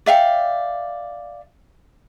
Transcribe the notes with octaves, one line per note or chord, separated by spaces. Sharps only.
D5 E5 F5 G5